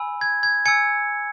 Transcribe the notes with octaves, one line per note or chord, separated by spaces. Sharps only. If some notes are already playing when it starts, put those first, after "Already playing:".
Already playing: G#5 B5 E6
G#6
G#6
G#5 E6 G#6 C#7